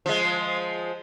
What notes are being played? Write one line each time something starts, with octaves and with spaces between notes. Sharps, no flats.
F3 G#3